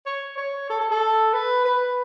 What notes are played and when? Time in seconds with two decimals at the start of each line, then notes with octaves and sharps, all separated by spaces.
0.06 C#5
0.38 C#5
0.70 A4
0.81 A4
0.91 A4
1.34 B4
1.65 B4